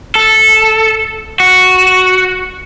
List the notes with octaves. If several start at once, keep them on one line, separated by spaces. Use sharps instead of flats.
A4
F#4